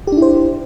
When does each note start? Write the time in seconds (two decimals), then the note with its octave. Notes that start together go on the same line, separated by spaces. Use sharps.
0.07 G4
0.12 D4
0.17 E4
0.22 C5